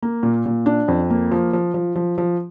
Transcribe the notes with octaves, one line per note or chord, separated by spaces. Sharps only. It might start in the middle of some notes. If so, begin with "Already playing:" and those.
A#3
A#2
A#2
D4
F2
A#3
F3
F3
F3
F3
F3